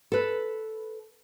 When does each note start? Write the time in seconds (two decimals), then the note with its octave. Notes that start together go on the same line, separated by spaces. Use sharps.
0.12 A4 B4